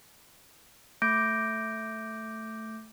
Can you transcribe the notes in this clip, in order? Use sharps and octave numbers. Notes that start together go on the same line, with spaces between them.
A3 D6 G6 A#6 D7